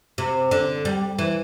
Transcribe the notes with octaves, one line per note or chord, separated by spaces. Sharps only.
C3
D3
G3
E3